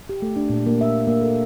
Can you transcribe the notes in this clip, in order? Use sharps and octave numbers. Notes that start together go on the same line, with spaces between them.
G4
A3
D4
A#2
A#3
E5
A#3
A4